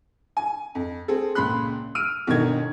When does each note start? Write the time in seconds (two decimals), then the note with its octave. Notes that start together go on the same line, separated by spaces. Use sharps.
0.37 G#5
0.75 F2
1.08 C4 G#4 A4
1.35 C#2 A#2 C#3 B5 C6 F#6
1.95 E6 F6 D7 D#7
2.27 G1 B2 D3 D#3 A#4 G#6